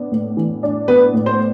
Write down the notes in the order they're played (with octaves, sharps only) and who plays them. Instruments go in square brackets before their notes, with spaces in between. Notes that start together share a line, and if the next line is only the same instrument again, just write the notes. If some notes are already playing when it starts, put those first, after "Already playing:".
Already playing: [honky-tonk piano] B3 D4
A2
E3
D4
[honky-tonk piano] B3 [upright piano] B4
[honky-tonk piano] A2
[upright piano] C5